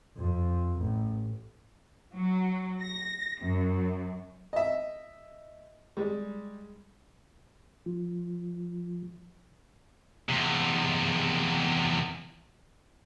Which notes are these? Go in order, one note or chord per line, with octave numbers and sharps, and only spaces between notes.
F2
A1
F#3
A#6
F#2
D#5 E5
G3 G#3
F3
E2 C3